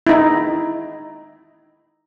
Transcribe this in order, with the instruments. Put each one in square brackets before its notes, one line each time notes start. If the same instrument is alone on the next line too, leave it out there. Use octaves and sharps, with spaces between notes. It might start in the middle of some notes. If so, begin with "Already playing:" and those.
[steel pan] D#4 E4